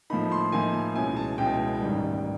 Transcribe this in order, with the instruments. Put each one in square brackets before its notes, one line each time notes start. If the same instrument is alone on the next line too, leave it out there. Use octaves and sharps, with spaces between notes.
[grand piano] A2 F3 A#3 D#4 B5
C6
A2 F3 A#3 D#4 G#5
C#2 B2 G#3 C#4 E4 G#5
A5
C#2 B2 G#3 C#4 E4 G5
A1 G#2 D#3 G3